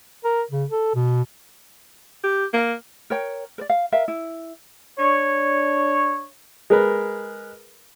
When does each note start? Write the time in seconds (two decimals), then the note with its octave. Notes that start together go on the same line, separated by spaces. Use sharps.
0.24 A#4
0.51 C#3
0.70 A4
0.95 B2
2.24 G4
2.53 A#3
3.10 A#4 C#5 G5
3.58 A#4 D5
3.69 F5
3.92 A#4 E5 F5
4.08 E4
4.99 D4 C#5
6.70 G#3 A#4 B4